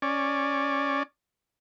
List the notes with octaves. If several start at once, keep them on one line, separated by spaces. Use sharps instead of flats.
C#4 D5